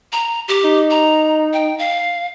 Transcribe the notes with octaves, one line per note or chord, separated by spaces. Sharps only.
A#5
G4
D#4
A#5
G5
F5